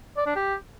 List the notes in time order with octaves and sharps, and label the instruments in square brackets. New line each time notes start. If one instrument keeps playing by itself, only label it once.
[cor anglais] D5
D4
G4